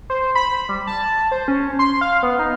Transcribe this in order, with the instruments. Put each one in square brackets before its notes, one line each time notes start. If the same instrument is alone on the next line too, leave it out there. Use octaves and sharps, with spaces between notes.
[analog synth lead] C5
B5
G3
A5
C5
C#4
C6
F5
B3
D#4